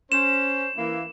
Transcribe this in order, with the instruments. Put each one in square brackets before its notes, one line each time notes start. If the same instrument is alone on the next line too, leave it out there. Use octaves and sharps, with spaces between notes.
[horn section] C#4 C5 [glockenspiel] E7
[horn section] E3 A#3 E4